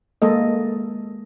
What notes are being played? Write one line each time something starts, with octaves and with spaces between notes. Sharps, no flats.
G#3 A#3 A4 D#5